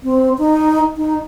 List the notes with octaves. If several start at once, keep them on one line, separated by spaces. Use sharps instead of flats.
C4
D#4
D#4